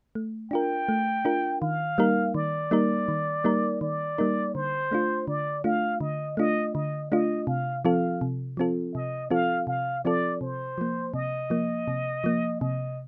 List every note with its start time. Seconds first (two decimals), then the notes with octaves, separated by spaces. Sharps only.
0.15 A3
0.51 D4 F4 A#4 G5
0.89 A3
1.25 D4 F4 A#4
1.61 D#3 F5
1.98 G3 A#3 D#4 A#4
2.34 D#3 D5
2.71 G3 A#3 D#4 A#4
3.08 D#3
3.44 G3 A#3 D#4 A#4
3.81 D#3 D5
4.18 G3 A#3 D#4 A#4
4.55 D3 C5
4.91 A3 D4 F4
5.28 D3 D5
5.64 A3 D4 F4 F5
6.01 D3 D#5
6.37 A3 D4 F4 D#5
6.75 D3 D#5
7.11 A3 D4 F4 D#5
7.47 C3 F5
7.85 F3 C4 F4 A4 F5
8.21 C3
8.57 F3 C4 F4 A4
8.94 C3 D#5
9.31 F3 C4 F4 A4 F5
9.67 C3 F5
10.04 F3 C4 F4 A4 D5
10.41 C3 C5
10.78 F3 A#3
11.14 C3 D#5
11.50 F3 A#3
11.88 C3
12.24 F3 A#3
12.60 C3 D#5